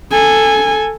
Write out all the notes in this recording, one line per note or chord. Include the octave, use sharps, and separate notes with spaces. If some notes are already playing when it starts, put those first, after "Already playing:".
A4 G#5